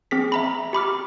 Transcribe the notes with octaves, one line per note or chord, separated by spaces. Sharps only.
C4 G#4 B6
E5 A#5 B5
G4 B5 D6 F6